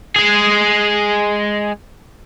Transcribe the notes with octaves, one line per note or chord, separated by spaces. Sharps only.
G#3 G#4